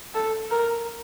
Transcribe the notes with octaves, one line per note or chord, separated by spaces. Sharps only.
A4
A#4